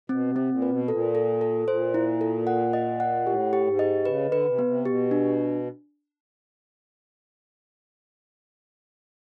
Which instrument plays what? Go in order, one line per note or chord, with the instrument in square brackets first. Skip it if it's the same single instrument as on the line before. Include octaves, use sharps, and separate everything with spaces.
[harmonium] B2 [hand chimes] C4
[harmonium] C3
[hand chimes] C4
[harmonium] A#2
[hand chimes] B4
[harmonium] B2
[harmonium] A#2 [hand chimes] A4
[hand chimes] A4
A4
[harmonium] A#2 [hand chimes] C5
[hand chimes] E4
A4
F#5
D#5
F#5
[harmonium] A2 [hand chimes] G4
[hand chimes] G4
[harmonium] G#2
[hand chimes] D#5
[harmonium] C#3 [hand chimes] B4
[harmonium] D3
[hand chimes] B4
[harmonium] C3
[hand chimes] B3
[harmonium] C3
[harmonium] B2 [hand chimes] G4
[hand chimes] D4